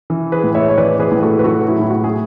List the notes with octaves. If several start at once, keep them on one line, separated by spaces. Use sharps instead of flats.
E3
G#4 B4
A2
C#5 E5
C#5
E3 B4 D5
G#4 B4
A2
B4
F#4 A4
B4
F#3 F#4 A4
E4 G#4
A2 E4
F#4
G#4